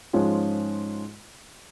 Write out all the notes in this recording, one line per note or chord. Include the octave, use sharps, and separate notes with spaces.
G#2 F3 G#3 C#4 F4